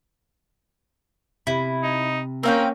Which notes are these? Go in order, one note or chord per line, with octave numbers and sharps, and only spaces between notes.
C3 E4
D#4
A#3 C4 C#4 A#4 F5 G5